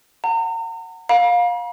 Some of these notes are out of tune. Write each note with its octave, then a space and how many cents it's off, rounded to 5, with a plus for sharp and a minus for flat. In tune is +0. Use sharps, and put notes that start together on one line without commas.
F#5 +0 A#5 -40
F5 +25 A#5 +45